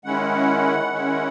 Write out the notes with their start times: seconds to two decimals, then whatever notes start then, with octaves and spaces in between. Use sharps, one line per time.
0.05 D#3 G#3 C#4 E4 F#5
0.93 D#3 G#3 C#4 E4